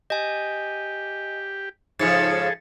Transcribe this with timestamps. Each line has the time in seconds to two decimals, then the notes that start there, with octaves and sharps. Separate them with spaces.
0.10 G4 D#5 G#5
1.99 G#2 C#3 F3 G#4 A4 A6 C#7